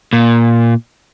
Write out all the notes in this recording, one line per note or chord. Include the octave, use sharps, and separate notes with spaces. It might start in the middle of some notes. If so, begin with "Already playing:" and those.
A#2